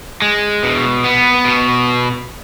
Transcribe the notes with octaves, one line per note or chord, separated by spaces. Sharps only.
G#3
B2
B3
B2